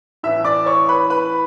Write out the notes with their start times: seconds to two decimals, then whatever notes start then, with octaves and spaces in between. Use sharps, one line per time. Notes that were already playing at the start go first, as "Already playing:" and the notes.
0.23 A2 E3 E5 E6
0.45 D5 D6
0.66 C#5 C#6
0.89 B4 B5
1.10 B4 B5